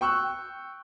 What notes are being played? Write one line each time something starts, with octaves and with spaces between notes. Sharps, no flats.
G5 C#6 E6 F#6